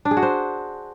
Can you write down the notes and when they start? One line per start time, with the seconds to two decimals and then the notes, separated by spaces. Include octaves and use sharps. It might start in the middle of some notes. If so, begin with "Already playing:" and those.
0.05 D4
0.11 G#4
0.17 F#4
0.22 C5